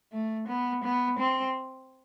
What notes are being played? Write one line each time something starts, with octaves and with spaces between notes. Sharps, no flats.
A3
B3
B3
C4